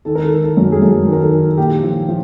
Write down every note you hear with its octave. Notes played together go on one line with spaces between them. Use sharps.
D#3 A4
A#4
A4
D#3
A4
F#2
G#4
F#2 A4
D#3
A#4
A4
D#3
A#2 G4
F3
F3